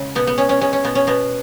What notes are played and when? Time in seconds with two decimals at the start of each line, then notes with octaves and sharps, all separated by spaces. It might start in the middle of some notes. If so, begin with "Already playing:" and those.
Already playing: C#3 G#3
0.15 B2 B3
0.27 B3
0.38 G#3 C#4
0.49 C#4
0.61 G#3 C#4
0.73 C#4
0.84 B2 B3
0.95 C#4
1.07 B2 B3